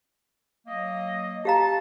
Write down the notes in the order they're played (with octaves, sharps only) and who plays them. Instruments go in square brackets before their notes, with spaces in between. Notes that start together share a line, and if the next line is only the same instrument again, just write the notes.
[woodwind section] F#3 A#3 D#5
[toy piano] G4 F5 A#5 [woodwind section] A5